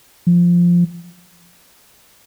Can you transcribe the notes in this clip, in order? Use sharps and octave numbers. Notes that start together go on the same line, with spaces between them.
F3